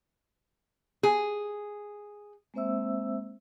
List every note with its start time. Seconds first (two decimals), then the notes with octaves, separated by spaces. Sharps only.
1.03 G#4
2.54 G#3 A#3 C4 C5 E5 E6